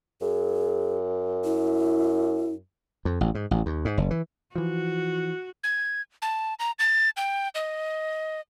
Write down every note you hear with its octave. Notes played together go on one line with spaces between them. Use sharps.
F#2 G#4
E4
F2
A1
G#2
A1
D#2
G#2
F#1
E3
E3 F3 F#4
G#6
A5
A#5
A6
G5
D#5